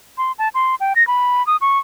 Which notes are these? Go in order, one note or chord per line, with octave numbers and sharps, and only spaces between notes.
C6
A5
C6
G5
A#6
B5
D#6
C#6